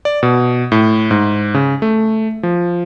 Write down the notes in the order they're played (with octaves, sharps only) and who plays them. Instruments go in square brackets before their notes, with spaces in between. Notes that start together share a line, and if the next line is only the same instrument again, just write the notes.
[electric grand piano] D5
B2
A2
G#2
C#3
A3
F3